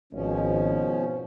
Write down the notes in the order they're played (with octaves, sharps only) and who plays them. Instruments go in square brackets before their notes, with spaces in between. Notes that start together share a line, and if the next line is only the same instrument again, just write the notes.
[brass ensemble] G#1 [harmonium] B2 F3 C#4